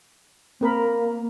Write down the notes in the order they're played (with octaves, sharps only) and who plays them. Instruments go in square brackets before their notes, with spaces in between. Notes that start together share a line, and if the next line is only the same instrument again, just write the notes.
[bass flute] A#3 [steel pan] C4 A#4 B5